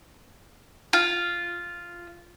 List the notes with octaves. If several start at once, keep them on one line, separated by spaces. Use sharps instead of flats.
F4